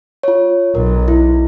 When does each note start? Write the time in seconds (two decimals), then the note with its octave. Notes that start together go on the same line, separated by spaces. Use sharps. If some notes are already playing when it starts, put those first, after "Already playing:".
0.23 F4 C#5
0.75 B1 A#4
1.08 E4